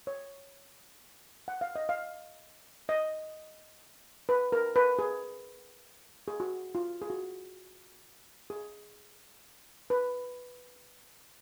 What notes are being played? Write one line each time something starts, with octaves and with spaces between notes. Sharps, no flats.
C#5
F#5
F5
D#5
F5
D#5
B4
A#4
B4
G#4
G#4
F#4
F4
G#4
F#4
G#4
B4